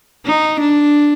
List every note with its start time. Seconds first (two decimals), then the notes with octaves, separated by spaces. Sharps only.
0.26 D#4
0.61 D4